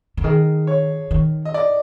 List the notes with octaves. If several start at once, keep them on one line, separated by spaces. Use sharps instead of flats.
D3
D#3 G#4
C#5
D#3
D#5
D5